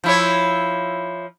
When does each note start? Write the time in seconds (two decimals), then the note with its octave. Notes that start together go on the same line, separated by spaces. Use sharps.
0.04 F3 E4 C#5